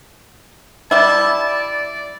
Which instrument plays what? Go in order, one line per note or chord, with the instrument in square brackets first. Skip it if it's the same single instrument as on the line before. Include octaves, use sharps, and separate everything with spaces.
[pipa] G3 E4 [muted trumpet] A5
[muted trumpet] D5